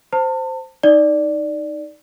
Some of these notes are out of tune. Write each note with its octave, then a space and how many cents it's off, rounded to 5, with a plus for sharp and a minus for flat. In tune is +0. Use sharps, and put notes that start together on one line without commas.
C5 -10 A5 +35
D#4 +0 D5 +0